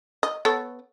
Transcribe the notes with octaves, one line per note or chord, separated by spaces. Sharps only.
D#5
B3 A4 C#5